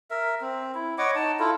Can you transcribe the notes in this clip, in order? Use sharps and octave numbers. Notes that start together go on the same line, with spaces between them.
A#4 E5
C4
E4
C#5 D#5 F#5 D6
D#4 A5
E4 F4 A4